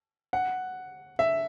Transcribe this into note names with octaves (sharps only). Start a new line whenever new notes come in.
F#5
E5